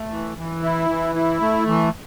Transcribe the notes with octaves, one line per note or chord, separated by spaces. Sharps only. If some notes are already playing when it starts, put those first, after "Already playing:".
Already playing: A3
E3
E3
E4
E3
E4
A3
E3